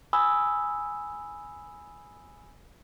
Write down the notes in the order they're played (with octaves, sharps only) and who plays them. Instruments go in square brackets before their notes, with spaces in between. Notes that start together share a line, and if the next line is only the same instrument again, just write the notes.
[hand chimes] G#5 B5 D#6 E6